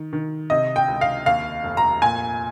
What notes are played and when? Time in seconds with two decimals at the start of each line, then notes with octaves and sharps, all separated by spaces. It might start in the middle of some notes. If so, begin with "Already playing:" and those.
Already playing: D#3
0.13 D#3
0.50 C3 D#5
0.76 G5
0.88 C#2
1.01 F5
1.26 D#2 F5
1.63 F1
1.77 A#5
2.02 A#2 G#5